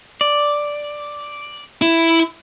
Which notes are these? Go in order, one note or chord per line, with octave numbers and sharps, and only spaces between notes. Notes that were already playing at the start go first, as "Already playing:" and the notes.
D5
E4